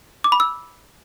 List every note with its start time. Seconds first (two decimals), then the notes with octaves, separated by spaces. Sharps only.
0.24 D6
0.32 B5
0.40 E6